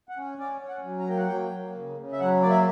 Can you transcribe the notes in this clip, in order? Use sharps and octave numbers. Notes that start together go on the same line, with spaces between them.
F#5
C#4
C#4 D5
C#4
F#5
F#3
A#5
A#3 G5
F#5
F#3 G5
A#3
C#3
C#3
E5
F#3 F#5
A#3 D5
E5